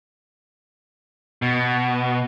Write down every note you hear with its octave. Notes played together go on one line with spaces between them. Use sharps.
B2